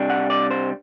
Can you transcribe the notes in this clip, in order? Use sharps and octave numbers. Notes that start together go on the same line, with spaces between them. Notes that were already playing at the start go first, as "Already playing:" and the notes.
Already playing: C3 G3 D4
F#5
D5
C5